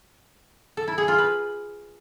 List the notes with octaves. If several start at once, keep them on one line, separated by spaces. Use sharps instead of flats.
A4
E4
G#4
F4
B4